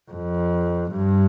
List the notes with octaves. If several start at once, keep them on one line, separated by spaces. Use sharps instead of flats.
F2
G2